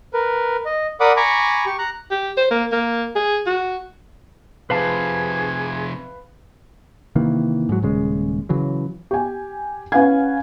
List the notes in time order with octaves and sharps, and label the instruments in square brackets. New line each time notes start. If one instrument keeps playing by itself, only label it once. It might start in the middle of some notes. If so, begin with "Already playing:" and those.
[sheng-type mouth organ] A#4 B4
D#5
A#4 D5 F#5 B5 D6 D#6
G#5 A#5 B5 C#6 D6
G4 C#6
A#5 F#6
[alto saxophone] G4
C5
A#3
A#3
G#4
F#4
[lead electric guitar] C3 F3 [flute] G#4 [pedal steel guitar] B4 F5 A5
[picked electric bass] C3 D#3 E3 A#3
G#2 F#3
D#1 C#3 G#3
C#3 E3 F#3
[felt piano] G4 G#5
C#4 B4 F5 F#5 G#5 G#6